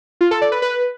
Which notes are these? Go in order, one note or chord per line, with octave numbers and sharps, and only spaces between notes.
F4
A4
D5
B4
B4